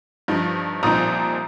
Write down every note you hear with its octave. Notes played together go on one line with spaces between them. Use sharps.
G2 F3 D#4
C2 A#2 F3 C4 D#4 A#5 D#6